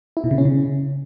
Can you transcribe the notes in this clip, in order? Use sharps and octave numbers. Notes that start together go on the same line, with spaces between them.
E4
B2
C#3
C#4
C#3